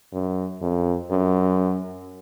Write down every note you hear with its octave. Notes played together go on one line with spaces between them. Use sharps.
F#2
F2
F#2